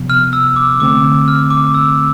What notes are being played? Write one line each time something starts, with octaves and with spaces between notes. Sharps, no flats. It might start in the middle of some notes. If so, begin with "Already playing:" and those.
Already playing: C3 F3 B3
F6
E6
D6
D3 A3 C4 D6
F6
D6
E6